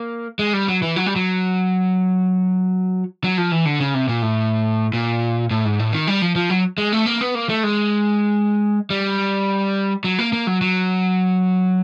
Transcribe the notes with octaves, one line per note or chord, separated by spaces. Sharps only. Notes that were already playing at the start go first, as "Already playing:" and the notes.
Already playing: A#3
G#3
G3
F#3
E3
F#3
G3
F#3
F#3
F3
E3
D3
C#3
C3
A#2
A2
A#2
A2
G#2
A2
D#3
G3
F3
F3
F#3
G#3
A3
A#3
B3
A#3
A3
G#3
G3
F#3
A#3
A#3
F#3
F#3